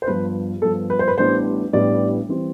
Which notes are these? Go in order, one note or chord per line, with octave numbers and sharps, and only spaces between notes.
C5
G2 F3 B3 B4
G2 F3 B3 A4
B4
C5
B4
A1 A2 G3 B3 D4 C5
A1 A2 G3 B3 D4 D5
E3 G3 C4